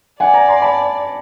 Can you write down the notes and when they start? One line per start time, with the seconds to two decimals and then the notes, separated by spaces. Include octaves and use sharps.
0.20 D5 F#5 G#5
0.34 G#5 A#5
0.48 A#5 C6
0.62 A5 B5